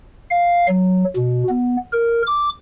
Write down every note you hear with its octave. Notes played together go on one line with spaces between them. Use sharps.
F5
F#3
B2
B3
A#4
D6